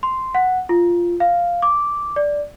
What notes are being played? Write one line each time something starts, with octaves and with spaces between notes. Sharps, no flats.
C6
F#5
F4
F5
D6
D5